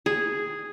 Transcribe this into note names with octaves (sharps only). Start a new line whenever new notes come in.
G#4